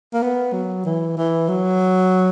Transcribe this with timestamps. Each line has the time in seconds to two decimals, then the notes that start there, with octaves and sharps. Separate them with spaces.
0.13 A#3
0.22 B3
0.53 F#3
0.85 E3
1.17 E3
1.48 F#3